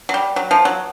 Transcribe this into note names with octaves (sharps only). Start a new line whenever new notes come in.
F#3
G3
F#3
F3
F#3